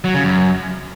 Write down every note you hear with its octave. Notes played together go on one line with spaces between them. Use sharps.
F#3
C#3
F#2